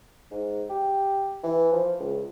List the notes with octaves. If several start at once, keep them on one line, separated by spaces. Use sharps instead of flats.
G#2
G4
E3
F3
C#2